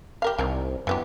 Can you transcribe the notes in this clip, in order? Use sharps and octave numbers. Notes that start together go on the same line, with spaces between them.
G4 A#4 F5
C2 D#3 C4 A#4
F#2 E3 B3 G4